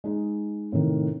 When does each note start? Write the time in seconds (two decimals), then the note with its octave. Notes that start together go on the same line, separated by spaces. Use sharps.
0.04 G#3 D#4
0.72 A2 C3 D#3